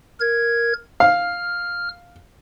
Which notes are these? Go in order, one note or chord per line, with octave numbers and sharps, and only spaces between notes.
A#4 G#6
F5 F6